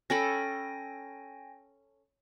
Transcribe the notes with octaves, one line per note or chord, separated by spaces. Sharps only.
C#4 A4 G5 G#5 B5 A#6